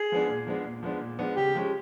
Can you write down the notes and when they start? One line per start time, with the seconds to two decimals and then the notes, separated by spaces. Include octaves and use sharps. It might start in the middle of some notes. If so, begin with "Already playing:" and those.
Already playing: G#4
0.12 F3 G#3 B3 D4
0.29 A#2
0.47 F3 G#3 B3 D4
0.64 A#2
0.83 F3 G#3 B3 D4
1.01 A#2
1.19 F3 G#3 B3 D4
1.36 C#3 G4
1.55 F3 G#3 C#4